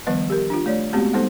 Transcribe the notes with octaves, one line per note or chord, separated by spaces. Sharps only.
D#3 F3 G3 B3 B4 D#5
G4 A#4
D4 F4
A3 C#5 D5
G#3 A3 B3 C4 F#4 G4
G3 G#3 B3 D#4 A4 C5